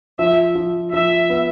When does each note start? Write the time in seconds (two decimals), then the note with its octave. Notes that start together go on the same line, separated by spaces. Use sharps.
0.19 F3 E5
0.55 F3
0.92 F3 E5
1.30 B3